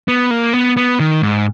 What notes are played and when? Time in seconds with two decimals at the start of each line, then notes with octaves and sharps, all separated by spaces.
0.08 B3
0.31 A#3
0.53 B3
0.77 B3
1.00 D#3
1.22 G#2